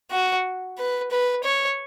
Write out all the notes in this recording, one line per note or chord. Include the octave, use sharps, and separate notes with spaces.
F#4
B4
B4
C#5